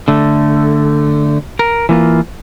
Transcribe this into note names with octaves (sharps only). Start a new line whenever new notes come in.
D3 A3
A#4
E3 A#3 F4